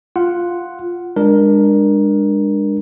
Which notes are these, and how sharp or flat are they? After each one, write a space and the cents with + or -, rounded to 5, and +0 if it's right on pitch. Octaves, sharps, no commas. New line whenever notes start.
F4 +0 F#5 +0
G#3 -30 D4 +15 A#4 +15